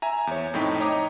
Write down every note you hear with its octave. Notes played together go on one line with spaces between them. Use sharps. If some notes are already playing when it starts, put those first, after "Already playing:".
E5 G#5 A#5
E2 C#5
F2 A2 D#4 G5 B6
C#5 D#5 A#5 D6 D#6